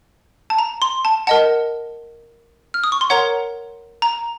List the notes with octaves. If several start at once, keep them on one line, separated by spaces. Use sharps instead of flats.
A5
A#5
C6
A5
A#4 D#5 F#5 A5
F6
D#6
C#6
C6
A#4 C#5 F#5 A#5
A#5